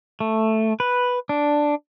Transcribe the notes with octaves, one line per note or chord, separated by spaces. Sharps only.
A3
B4
D4